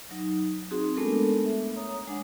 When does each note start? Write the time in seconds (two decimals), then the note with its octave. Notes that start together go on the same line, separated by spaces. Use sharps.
0.11 F#3 D#4
0.71 C4 D#4 F#4 G#4
0.96 G#3 A3 B3 D4 A4 A#4
1.45 E5
1.76 C#5 A#5 D#6
2.08 G#3 D4 F#5